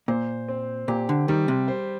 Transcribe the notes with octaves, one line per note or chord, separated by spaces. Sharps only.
A#2 C5
C4
A#2 G4
D3
D#3 G3
C3
C5